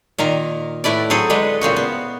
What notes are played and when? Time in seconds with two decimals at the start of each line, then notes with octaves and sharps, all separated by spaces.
0.18 A#2 D#3 A#4 A#5
0.84 A2 A3 E4 B4 D5
1.10 F#3 C4 G#4 A4
1.30 D3 G#3 D4 B4
1.61 A#2 C#3 C4 F#4
1.76 B3